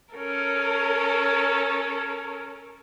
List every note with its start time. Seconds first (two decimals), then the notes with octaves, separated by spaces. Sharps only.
0.13 C#4 A4 A#4